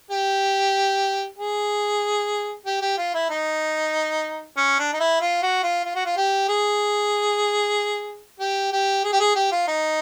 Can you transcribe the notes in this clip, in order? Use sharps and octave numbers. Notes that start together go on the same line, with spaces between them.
G4
G#4
G4
G4
F4
E4
D#4
C#4
D4
D#4
E4
F4
F#4
F4
F4
F#4
F4
G4
G#4
G4
G4
G#4
G4
G#4
G4
F4
D#4